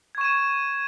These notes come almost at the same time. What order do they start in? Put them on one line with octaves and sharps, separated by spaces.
G#6 C#6 E7 D#7